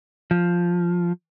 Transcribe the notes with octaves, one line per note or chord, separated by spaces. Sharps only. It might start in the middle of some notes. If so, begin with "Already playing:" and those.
F3